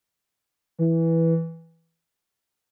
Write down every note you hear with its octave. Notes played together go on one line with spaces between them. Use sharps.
E3